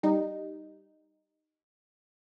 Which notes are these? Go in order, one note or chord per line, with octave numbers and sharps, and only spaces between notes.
G3 D#4